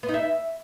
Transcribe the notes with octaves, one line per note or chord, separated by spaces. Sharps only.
B3
D#4
E5